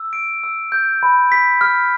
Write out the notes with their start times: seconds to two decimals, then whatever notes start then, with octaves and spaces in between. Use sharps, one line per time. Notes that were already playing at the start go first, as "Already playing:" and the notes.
Already playing: E6
0.13 D7
0.44 E6
0.72 G6
1.03 B5
1.32 B6
1.61 F6